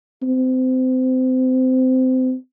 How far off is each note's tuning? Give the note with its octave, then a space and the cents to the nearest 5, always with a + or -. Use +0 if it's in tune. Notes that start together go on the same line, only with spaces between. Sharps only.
C4 -25